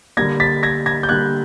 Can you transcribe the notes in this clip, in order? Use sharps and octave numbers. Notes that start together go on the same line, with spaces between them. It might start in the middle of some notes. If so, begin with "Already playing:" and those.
D3 G3 A#3 G#6 A#6
A6 B6
G#6 A#6
G#6 A#6
G6
D3 G3 A#3 F#6 G#6